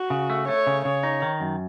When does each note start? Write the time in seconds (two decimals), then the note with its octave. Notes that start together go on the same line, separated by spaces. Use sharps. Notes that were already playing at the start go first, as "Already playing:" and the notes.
Already playing: F#4
0.10 C#3
0.30 A3
0.48 A3 C#5
0.67 C#3
0.85 C#3 C#5
1.03 D#4
1.22 D#3
1.40 F#2